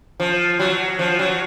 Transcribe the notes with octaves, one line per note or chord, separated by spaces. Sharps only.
F3
F#3
F3
F#3